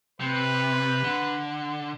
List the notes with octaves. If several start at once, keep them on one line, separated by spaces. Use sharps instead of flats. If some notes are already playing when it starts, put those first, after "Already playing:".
C3 B4
D3